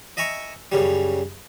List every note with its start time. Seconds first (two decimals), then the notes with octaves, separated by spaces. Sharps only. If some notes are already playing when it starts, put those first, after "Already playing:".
0.17 D#5 E5 G#5 A#5 C#6
0.72 F#2 C#3 G3